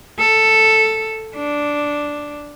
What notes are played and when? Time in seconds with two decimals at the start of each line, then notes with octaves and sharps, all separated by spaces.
0.19 A4
1.36 D4